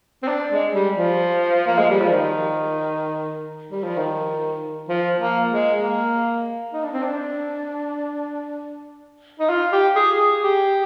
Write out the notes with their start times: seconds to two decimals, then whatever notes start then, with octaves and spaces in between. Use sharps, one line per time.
0.23 C4
0.28 D4
0.51 G#3
0.74 G3
0.97 F3
1.67 A#3
1.78 G#3
1.90 G3
2.01 F3
2.12 D#3
3.71 G3
3.84 F3
3.97 D#3
4.89 F3
5.20 A#3
5.51 G#3
5.81 A#3
6.73 D#4
6.83 D4
6.93 C4
7.03 D4
9.40 D#4
9.49 F4
9.72 G4
9.96 G#4
10.19 G#4
10.42 G4